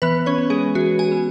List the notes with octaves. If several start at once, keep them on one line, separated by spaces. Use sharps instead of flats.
E3 B3 B4
C#4 C#5
B3
G#3 G#4
E3 F#4
G#4 G#5
B3